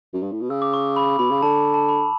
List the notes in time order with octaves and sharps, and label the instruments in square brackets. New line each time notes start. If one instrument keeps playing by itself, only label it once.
[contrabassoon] F#2
G2
A2
B2
[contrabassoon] C#3 [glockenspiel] E6
[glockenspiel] D6
C#6
B5
[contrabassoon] B2 [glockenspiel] B5
[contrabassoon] C#3
[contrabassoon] D3 [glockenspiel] A5
[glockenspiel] A5
B5